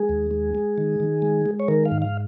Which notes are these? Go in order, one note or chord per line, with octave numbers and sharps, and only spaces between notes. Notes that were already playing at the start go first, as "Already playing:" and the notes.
Already playing: G#3 G#4
D#2
G#3
G#3
D#3
D#3
G#3
G#3
C#5
D#3 A#4
F5
G#2
F5